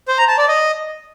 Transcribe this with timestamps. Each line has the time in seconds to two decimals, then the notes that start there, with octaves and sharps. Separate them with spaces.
0.08 C5
0.18 A#5
0.28 A5
0.38 D5
0.48 D#5